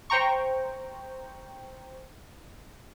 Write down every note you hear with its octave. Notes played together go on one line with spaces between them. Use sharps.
C5 G5 A#5 C#6